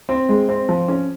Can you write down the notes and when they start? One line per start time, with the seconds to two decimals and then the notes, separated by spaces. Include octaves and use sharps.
0.09 C4
0.29 G#3
0.49 C4
0.69 F3
0.88 C#4